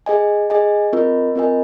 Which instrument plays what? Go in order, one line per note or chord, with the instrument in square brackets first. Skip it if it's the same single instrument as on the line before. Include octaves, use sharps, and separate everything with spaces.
[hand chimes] G#4 D#5 G#5
G#4 D#5 G#5
C4 F4 A#4 D#5
C4 F4 A#4 D#5 G#5